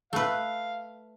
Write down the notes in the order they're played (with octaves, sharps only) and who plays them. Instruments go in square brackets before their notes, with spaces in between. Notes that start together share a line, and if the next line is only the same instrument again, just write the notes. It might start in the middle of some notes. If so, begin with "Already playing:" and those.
[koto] A3 B4 [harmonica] F5